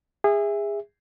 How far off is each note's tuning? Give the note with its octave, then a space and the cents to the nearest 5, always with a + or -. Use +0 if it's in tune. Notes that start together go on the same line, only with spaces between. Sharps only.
G#4 -25 E5 +0